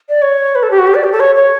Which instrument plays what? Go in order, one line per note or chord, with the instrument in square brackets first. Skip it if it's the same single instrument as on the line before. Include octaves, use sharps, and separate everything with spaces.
[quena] D5
C#5
B4
A4
G4
F#4
G4
D5
G4
A4
C#5
C#5